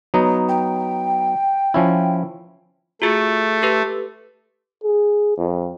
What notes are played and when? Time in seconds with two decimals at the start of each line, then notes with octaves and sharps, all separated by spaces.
0.14 F#3 B3 D#4
0.48 G5
1.74 F3 C#4 E4
3.02 A3 F4 F#4 G#4
3.62 G4 A4 B4
4.84 G#4
5.38 F2